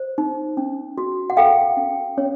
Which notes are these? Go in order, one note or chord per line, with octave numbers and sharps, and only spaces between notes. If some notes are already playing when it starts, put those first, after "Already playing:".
Already playing: C5
D#4
C#4
F#4
F#5
A4 F5 G5
C#4
C#4 C#5